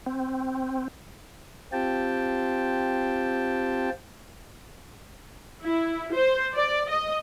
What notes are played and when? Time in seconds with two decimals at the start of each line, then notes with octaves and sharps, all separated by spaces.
0.06 C4
1.72 C4 F4 G4 G5 A5
5.63 E4
6.14 C5
6.55 D5
6.89 D#5